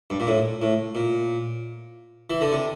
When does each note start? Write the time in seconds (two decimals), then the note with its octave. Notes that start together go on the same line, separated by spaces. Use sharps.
0.10 G2
0.20 A#2
0.27 A2
0.62 A2
0.95 A#2
2.30 E3
2.41 D3
2.52 C3